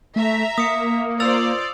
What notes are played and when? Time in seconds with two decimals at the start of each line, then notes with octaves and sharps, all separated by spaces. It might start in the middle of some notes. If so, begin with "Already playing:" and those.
0.16 A3 E5 A#5
0.58 A#3 D#6 C#7
1.20 F4 C5 D5 E6 A6 F7